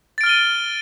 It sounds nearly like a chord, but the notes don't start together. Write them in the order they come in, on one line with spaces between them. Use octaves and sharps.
A6 D7 F6 G7 D#7